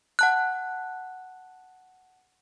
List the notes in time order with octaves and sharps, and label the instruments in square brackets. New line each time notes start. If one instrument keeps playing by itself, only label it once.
[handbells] F#5 A5 F#6